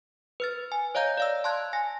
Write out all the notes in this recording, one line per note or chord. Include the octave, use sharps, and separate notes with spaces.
B4 F6 A6
G#5
C#5 D#5 F5 A#5 G6
D5 F5 E6
A5 C6 F#6 G#6
G#5 A#6